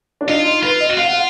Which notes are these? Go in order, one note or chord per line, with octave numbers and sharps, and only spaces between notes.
D4
D#4 F4
D#4
F4 B4
D#5
F#4
F4 F5
F#5
F5